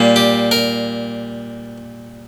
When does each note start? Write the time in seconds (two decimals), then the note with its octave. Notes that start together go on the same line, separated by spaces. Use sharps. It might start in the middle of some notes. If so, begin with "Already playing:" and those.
Already playing: A#2 G3 A#3
0.16 G4
0.51 A#4